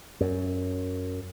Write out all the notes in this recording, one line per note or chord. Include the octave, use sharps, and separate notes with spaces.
F#2